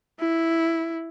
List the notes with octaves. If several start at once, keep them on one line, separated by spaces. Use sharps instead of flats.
E4